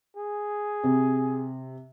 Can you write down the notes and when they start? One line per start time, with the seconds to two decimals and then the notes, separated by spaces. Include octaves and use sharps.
0.17 G#4
0.84 C3